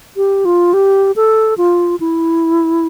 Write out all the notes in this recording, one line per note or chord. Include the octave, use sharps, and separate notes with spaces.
G4
F4
G4
A4
F4
E4